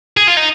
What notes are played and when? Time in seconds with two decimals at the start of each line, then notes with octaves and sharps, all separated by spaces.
0.17 G#4
0.28 F4
0.37 D#4